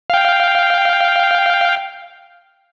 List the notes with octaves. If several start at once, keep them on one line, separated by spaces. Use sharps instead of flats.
F5 G5